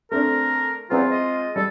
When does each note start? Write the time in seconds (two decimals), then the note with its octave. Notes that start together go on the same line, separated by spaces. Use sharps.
0.11 A3 C4 D4 A#4
0.90 E2 F#3 C4 F4 C5
1.10 G#3 D#5
1.56 G3 A4